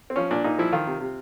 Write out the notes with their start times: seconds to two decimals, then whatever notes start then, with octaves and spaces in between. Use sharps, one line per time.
0.10 C4
0.16 F3 C#4
0.31 A#2 D4
0.44 A#2 D#4
0.59 F3 E4
0.72 D#3 F4
0.87 C3
1.01 C3